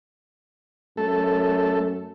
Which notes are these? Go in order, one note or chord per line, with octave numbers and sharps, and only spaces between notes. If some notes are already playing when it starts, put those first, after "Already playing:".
F#2 A3 A4